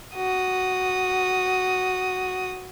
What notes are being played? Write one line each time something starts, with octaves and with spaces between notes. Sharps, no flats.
F#4 D#6